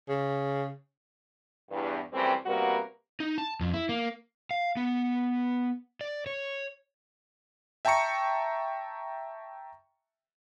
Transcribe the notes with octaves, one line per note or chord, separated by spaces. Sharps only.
C#3
E2 G2
F#2 E3 G3 A3 C4
C3 G3 A#3 B3 F#4 A#4
D#4
A5
F2
E4
A#3
F5
B3
D5
C#5
E5 G5 A5 A#5 C#6 C#7